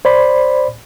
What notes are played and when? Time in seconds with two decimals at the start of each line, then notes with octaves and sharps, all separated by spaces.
0.05 C5 D5 B5